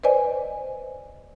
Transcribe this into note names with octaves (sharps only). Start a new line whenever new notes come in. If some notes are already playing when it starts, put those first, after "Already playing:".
B4 C5 D5 D#5 G#5